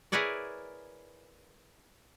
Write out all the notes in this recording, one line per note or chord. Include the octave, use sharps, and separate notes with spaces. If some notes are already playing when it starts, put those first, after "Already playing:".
E4 G#4 A#4 B4 C#5 D5